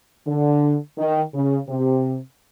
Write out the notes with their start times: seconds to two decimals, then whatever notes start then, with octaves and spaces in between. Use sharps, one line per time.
0.27 D3
0.98 D#3
1.34 C#3
1.69 C3